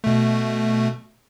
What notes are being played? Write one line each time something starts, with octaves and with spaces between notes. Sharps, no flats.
B2 A3